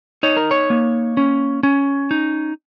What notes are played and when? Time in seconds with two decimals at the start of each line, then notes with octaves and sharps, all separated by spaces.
0.23 D#4 C#5
0.37 A#4
0.51 C#5
0.70 A#3
1.17 C#4
1.63 C#4
2.11 D#4